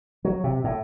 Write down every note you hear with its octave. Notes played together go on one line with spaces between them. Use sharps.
F#3
C3
A2